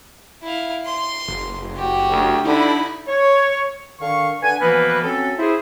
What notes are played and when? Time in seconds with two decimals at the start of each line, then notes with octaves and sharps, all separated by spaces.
0.43 E4 F5
0.86 C6
1.28 F#1
1.75 F#4 G4
2.10 D2
2.45 D3 D#4 E4 B5
3.08 C#5
4.00 D3 D#3 F5 C#6
4.42 D3 B4 F#5 G#5
4.60 B2 E3 F3 A#3 B3 B4
5.03 F#3 C4 C#4 A4
5.39 E4 G#4 C5